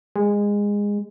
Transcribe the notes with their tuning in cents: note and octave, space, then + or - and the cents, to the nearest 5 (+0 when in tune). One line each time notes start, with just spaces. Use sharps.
G#3 -20